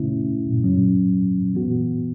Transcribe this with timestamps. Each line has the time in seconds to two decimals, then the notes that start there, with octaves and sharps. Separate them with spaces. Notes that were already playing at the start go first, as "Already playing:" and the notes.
Already playing: C#3 A3 C#4 E4
0.64 F#2 F#3 C#4
1.53 E3 B3 F#4